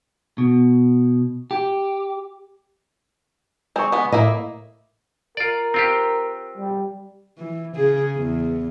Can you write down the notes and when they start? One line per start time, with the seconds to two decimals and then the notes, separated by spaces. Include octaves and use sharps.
0.38 B2
1.51 G4
3.76 G#3 C4 G#5 C#6
3.92 G#3 B3
4.12 A2 A#3 E4 D#5
5.37 F4 A#4 D5
5.74 C4 F4 G4
6.58 G3
7.38 E3
7.76 C#3 G#4
8.16 E2